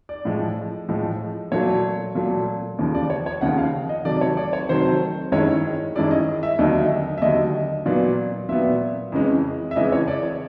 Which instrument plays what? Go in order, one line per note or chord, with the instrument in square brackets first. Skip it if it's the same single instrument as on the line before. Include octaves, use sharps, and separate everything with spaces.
[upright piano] D5
A2 F3 G#3
A2 F3 G#3
A#2 F#3 A3 C#5
A#2 F#3 A3
D#2 C#3 F3
D5
C#5
C#5
D#2 C#3 F3 F#5
F5
D#5
C3 D#3 F#3 A3 D5
C#5
D5
C#5
C3 D#3 F#3 A3 C5
G2 D#3 G#3 C#4 E4 C#5
G2 D#3 G#3 C#4 E4 D5
D#5
E5
D#2 D3 F#3 D#5
E5
D#5
E5
D#2 D3 F#3 D#5
A#2 F#3 B3 D5
A#2 F#3 B3 E5
F2 C#3 E3 G#3 C#4
E5
F2 C#3 E3 G#3 C#4 D#5
C#5
D5
C#5